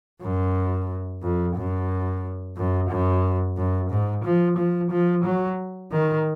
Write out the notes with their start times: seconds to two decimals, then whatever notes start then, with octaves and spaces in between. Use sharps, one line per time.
0.22 F#2
1.23 F2
1.56 F#2
2.57 F#2
2.90 F#2
3.57 F#2
3.90 G#2
4.24 F3
4.57 F3
4.91 F3
5.25 F#3
5.92 D#3